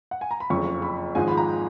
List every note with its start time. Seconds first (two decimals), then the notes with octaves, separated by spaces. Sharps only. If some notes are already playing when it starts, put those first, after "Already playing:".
0.11 F#5
0.21 G#5
0.31 A#5
0.40 B5
0.50 F#1 F2 C#3 F3 C#6
0.82 B5
1.15 G#1 G#2 F3 G#3 G#5
1.28 B5
1.37 A#5